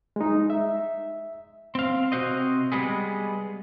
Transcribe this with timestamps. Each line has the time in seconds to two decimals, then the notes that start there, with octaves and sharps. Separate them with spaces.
0.16 G#3 D#4
0.50 E5
1.75 C4 F5
2.12 C3 C4 F#4 C5 D#5
2.72 G3 G#3 B3 G#4